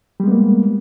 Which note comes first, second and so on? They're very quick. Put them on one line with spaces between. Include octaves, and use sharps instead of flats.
G3 G#3 B3 A#3